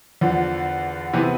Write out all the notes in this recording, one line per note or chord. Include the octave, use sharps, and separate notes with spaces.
E2 D3 F3
C3 E3 B3 E4